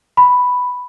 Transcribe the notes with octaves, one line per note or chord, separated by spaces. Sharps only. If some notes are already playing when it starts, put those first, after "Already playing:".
B5